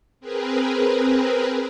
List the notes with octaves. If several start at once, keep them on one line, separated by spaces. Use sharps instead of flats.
C4 G#4 A#4 B4